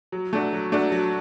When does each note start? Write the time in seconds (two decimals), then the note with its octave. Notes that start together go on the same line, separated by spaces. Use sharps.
0.12 F#3
0.33 A3 D4 F#4
0.53 F#3
0.72 A3 D4 F#4
0.92 F#3